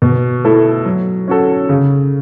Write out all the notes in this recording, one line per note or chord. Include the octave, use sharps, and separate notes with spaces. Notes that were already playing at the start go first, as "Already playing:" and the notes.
B2
A3 E4 A4
F#3
C#4 F#4 A4
C#3